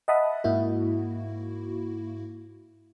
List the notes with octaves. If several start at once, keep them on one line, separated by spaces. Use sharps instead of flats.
D#5 E5 F#5 A5 B5 D#6
G#2 A#3 E4 F#4